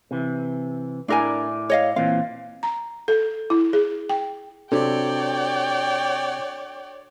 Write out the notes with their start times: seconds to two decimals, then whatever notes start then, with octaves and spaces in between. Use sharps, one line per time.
0.11 C3 E3
1.08 A2 D4 E4 A#4 D5 G#5
1.70 C#5 D#5 F5
1.96 A#2 E3 C4 F5
2.63 A#5
3.08 A4
3.50 E4
3.73 G#4
4.09 G5
4.72 C3 D4 F#4 A4 C#5 D5 G5